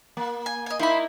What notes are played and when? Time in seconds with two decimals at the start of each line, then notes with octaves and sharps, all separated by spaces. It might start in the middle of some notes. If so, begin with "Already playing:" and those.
0.17 A#3
0.46 G#5
0.66 D#5 G#5
0.79 A#3 D#4 E4 C5 B5